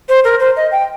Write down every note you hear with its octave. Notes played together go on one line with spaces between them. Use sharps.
C5
A#4
C5
D#5
G5